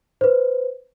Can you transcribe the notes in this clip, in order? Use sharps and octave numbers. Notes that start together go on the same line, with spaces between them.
B4 C5